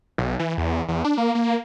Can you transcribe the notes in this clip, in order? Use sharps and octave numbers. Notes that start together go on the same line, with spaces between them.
B1
E3
E2
E2
D4
A#3
A#3